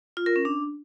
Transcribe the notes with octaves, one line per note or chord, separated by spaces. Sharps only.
F4
A#4
C#4
D4